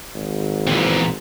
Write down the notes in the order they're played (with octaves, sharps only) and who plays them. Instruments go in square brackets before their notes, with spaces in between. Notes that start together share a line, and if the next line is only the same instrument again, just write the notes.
[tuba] G#1
[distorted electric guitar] A#2 B3 [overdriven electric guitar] E3 C4